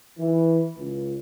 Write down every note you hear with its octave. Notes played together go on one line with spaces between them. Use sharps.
E3
C#2